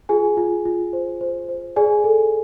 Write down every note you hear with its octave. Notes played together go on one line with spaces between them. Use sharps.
F4 G#4 G#5
F4
F4
C5
C5
C5
G#4 D5 G#5
A4